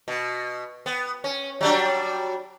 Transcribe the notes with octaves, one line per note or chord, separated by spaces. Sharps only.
B2
B3
C#4
F#3 G3 D4